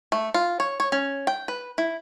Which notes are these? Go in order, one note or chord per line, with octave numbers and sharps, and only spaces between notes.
A3
F4
C#5
C#5
C#4
G5
B4
E4